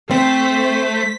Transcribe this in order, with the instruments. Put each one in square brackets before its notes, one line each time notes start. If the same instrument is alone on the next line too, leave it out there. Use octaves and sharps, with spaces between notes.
[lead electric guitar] A3 [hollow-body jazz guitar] C4 [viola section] C5 [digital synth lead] B6